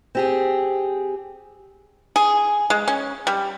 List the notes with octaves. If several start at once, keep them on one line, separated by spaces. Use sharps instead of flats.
C4 G4 G#4
G#4
G#3
C#4
G3